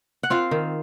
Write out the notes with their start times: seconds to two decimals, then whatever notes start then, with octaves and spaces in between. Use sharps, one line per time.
0.23 F#5
0.30 C4 F4 F5
0.51 D#3